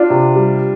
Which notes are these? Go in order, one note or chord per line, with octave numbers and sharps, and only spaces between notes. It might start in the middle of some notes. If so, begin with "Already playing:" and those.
Already playing: D4 F4
C3
G3